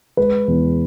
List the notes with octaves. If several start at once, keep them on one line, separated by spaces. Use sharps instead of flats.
G#3 B4
E2